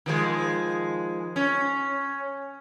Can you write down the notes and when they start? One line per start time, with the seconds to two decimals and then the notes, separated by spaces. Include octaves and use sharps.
0.06 D#3 F3 G#3
1.36 C#4